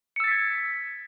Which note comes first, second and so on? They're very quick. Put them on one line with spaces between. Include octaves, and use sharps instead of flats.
C#7 E6 A6 B6 G#6